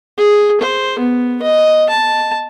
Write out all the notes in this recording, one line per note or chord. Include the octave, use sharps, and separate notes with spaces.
G#4
C5
B3
D#5
A5